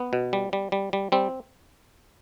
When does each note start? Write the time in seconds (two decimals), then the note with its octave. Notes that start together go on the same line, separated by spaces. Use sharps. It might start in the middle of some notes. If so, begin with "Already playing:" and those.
Already playing: B3
0.13 B2
0.33 G3
0.53 G3
0.72 G3
0.93 G3
1.12 G3 C4